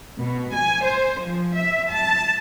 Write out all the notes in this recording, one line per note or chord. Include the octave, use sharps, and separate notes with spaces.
B2
G#5
C5
F3
E5
A5